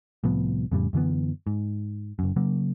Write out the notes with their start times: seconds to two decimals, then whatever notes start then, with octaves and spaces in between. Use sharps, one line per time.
0.24 C2 A2 F3 B3
0.72 F2 A2 C#3 G3
0.93 F#2 D3 E3 B3
1.47 G#2
2.19 F#1 F#2
2.36 C#3 F#3 A#3